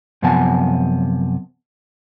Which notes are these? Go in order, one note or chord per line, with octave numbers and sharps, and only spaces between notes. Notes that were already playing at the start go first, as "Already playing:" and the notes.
F#2 C3 F3 B3 G#5 A5